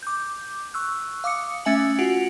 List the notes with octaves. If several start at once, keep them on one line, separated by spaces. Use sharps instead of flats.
D6 G6
C#6 E6 F#6
F5 D6 D#6 C#7
A3 C#4 E5 G#5 F#7
F4 F#4 F#5 D7